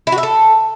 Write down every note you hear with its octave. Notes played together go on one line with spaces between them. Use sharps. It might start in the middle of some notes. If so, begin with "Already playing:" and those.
E4
F#4
E5
A4